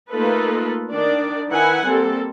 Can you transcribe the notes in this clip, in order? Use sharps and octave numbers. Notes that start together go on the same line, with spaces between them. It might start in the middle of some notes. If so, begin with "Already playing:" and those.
A3 A#3 D#4 F4 A4 B4
D#3 D4 D5
D#3 E4 B4 F#5 G#5
G3 A#3 C4 A4